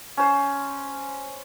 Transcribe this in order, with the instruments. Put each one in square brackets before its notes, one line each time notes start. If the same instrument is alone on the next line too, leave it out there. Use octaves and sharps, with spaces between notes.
[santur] C#4 C5